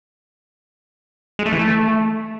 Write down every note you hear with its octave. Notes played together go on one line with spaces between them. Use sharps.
G#3
A3
E3
A3